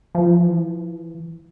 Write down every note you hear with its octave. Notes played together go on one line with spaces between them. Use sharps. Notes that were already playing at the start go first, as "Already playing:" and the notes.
F3
E3